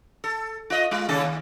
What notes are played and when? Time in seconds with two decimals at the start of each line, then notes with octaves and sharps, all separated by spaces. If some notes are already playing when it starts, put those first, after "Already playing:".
0.24 A4
0.70 F4 D#5
0.91 G#3 F4
1.09 D#2 C#3 A4
1.24 D#2